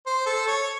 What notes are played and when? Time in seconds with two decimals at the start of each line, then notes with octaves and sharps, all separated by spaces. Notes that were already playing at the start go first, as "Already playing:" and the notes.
0.06 C5
0.26 A4
0.47 C#5